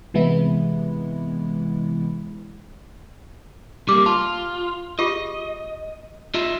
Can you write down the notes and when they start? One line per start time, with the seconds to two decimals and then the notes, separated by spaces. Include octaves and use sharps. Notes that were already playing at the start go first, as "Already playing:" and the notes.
0.14 C3 E3 G#3 B3 E4
3.89 G3 A#3 D6
4.06 F4 A5
4.99 F4 G4 G#4 D#5
6.34 F4 D#5 E5